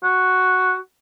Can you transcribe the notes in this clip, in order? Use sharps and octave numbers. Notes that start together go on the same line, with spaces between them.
F#4